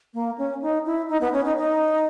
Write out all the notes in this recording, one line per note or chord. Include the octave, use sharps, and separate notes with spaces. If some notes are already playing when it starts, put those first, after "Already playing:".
A#3
C#4
D#4
E4
D#4
B3
C#4
D#4
D#4